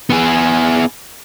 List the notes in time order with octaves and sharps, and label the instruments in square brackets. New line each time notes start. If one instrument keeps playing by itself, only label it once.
[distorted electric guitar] B3 G#4